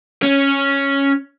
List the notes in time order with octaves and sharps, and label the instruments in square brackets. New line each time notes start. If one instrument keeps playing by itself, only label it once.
[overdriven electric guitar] C#4